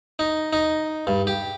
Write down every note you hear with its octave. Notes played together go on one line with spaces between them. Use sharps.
D#4
D#4
G2
G4